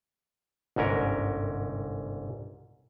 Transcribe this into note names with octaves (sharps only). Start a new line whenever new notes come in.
G1 C2 G#2 C#4 A#4